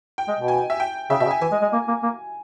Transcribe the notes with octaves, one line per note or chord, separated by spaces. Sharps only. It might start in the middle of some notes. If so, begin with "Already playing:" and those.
G5
G#3
B2
G#5
E5
G5
C#3 E5
B2 E5
C#3
G#5
E3 G#5
G#3
G#3
A#3
A#3
A#3